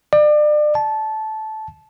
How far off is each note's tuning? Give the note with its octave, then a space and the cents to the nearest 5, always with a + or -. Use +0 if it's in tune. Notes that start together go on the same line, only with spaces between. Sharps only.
D5 +35
A5 -15